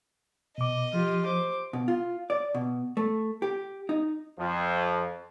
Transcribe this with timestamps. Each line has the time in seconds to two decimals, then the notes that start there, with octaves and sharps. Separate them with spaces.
0.58 B2 D#5 D6
0.93 F3 F4 G4
1.25 C5 D6
1.73 B2
1.88 F4
2.30 D5
2.55 B2
2.97 A3
3.42 G4
3.89 D#4
4.39 F2 F3